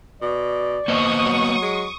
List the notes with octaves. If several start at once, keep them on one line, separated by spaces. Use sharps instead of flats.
B2 D5
F3 A#3 B3 D#5 C#6 D#6
F#3
G#3